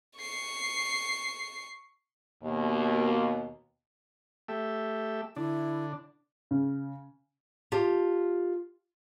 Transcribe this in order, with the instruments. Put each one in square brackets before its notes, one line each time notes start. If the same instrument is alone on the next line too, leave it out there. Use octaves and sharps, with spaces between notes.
[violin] C#6 C7
[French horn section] D#2 B2 A#3
[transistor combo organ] A3 G4 E5
[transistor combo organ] D3 D4 [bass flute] E4
[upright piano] C#3
[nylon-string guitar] F4 G4 A5